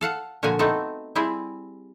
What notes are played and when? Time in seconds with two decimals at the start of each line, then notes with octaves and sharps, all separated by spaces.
0.01 A4 F5 F#5 A5
0.43 A#2 D3 F3 F#4 G#5 A#5
0.59 A3 B3 C4 D#4 A4
1.15 G3 C4 E4 G#4